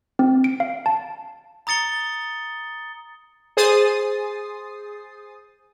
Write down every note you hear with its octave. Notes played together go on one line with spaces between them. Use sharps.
C4
D7
F5
A5
A#5 D#6 A6 C#7 G7
G#4 C5 D#6 A6 C7